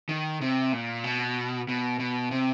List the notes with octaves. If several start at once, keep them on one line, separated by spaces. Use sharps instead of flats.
D#3
C3
A#2
B2
B2
B2
C3